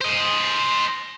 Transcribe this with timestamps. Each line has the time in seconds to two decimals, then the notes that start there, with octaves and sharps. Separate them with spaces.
0.01 C5 D#5